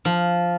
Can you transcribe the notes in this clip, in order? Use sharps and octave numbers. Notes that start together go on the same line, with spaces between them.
F3